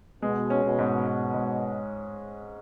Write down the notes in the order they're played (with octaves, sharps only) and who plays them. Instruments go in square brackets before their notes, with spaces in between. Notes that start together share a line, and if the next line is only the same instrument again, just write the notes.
[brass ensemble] B2 [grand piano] G#3
[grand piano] C#4
[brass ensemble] B2
[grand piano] G#2
G#2
G#2